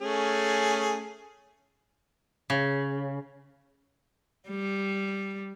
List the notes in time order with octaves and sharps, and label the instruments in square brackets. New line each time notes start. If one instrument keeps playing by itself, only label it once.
[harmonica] A3 C#4 G#4
[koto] C#3
[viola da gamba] G3